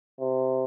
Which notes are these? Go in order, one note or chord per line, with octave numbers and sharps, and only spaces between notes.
C3